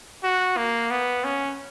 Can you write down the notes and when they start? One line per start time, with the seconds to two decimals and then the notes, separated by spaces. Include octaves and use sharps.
0.24 F#4
0.57 A#3
0.91 B3
1.24 C#4